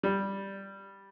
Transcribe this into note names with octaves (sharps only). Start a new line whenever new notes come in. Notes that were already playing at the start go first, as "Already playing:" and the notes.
G3